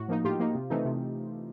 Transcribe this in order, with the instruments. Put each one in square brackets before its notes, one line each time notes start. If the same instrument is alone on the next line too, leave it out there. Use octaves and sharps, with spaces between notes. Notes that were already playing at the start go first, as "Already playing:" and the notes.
Already playing: [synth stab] A2 F#4
F3 A#3 D#4
A2 F4 G4
F3 A#3 D#4
C3
E3 A3 C4 D#4
C3